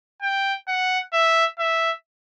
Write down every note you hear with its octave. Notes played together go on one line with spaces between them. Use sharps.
G5
F#5
E5
E5